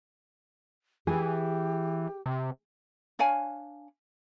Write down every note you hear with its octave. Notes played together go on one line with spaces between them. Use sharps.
E3 G4 G#4
C3
D4 C#5 F5 G#5